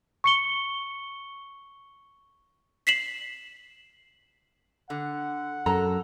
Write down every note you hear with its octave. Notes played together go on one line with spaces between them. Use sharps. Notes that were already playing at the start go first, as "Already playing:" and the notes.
C#6 C#7 G7
B6 C7 E7 F#7
D3 F#5
F#2 A4 A#5